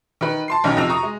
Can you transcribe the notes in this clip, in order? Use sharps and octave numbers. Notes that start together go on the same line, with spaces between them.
D#3 B4
A5 C6 C7
B1 D#3 C#4 F6
F2 C3 E6 A#6 F7
A#5 C#6 D#6
G#3